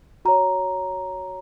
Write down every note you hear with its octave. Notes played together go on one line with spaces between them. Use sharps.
F#4 C#5 A#5